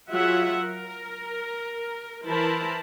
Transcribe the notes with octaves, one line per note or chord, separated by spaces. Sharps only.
F#3 F4 G#4 E5 F#5
A#4
E3 E4 A#4 C5 A5 B5